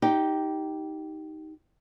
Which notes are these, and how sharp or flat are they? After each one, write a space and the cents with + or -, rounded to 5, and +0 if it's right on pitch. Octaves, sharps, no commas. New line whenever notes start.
D#4 +10 G4 -10